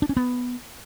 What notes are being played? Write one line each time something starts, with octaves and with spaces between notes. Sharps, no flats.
D4
C#4
B3